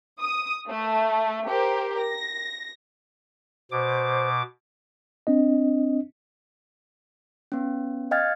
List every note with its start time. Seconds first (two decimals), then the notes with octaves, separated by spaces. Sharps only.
0.20 D#6
0.69 A3
1.47 G4 A#4 C5
1.99 A#6
3.71 B2 C5 D6
5.27 C4 D4 D#5
7.52 B3 C#4
8.11 D#5 F5 G5 F6 G#6 A6